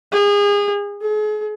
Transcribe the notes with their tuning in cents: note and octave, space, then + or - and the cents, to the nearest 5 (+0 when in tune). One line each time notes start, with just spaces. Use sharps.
G#4 -30
G#4 +40